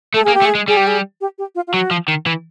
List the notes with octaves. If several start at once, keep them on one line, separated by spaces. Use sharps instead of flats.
A3 A4
A#3 G#4
G4
A3
G#4
G#3
G3 G#4
G4
G#4
G4
G4
F4
F4
F#3 F#4
F3
D#3
E3